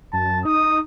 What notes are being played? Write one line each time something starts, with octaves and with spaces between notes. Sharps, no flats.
F#2 A5
D#4 D#6